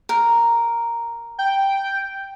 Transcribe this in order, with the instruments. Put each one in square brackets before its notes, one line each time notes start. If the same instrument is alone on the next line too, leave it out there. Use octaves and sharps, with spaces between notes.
[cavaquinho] A#4
[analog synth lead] G5